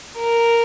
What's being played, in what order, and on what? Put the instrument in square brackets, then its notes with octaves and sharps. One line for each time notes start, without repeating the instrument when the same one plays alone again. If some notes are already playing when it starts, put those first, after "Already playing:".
[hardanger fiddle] A#4